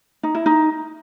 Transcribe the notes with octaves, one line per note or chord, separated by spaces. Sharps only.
D#4
E4
D#4